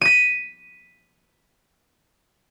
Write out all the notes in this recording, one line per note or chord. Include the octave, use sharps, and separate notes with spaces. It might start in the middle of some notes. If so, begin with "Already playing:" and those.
B6 D#7